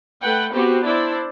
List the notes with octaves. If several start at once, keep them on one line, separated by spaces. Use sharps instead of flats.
A3 B4 F#5 G5
B3 C4 F#4 G4 C5
D4 E4 C5 D5